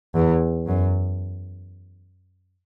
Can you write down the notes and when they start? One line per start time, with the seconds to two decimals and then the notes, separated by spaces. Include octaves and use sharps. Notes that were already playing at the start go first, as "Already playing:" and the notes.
0.15 E2
0.67 F#2